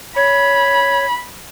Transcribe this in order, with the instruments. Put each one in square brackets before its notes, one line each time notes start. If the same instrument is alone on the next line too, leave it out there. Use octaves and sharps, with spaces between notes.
[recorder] C#5 [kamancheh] B5